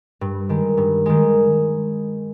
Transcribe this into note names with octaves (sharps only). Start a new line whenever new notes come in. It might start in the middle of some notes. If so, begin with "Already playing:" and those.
G2
D#3 G#3
G2
D#3 G#3